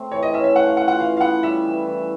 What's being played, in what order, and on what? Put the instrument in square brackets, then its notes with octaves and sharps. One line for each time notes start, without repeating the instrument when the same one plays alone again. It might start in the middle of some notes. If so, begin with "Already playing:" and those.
Already playing: [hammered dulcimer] A3 C4
[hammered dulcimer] E3 [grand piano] C#5
[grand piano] D#5
[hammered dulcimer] C#4 [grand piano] E5
[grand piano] E5
[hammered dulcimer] A3 [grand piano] F#5
[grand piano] F5
[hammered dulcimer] F4 [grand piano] F#5
[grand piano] F#5
[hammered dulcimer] E3 [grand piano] F5
[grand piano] F5
[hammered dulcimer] B3 [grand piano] F#5
[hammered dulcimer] G3 [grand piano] E5
[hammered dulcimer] E3
E3